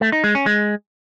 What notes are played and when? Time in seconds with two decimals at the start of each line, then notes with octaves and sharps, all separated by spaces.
0.01 A3
0.12 D#4
0.24 G#3
0.35 C#4
0.46 G#3